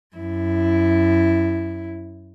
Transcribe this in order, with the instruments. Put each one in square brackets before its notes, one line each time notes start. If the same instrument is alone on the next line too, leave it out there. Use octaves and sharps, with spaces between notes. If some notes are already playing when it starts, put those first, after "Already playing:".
[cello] F#2 E4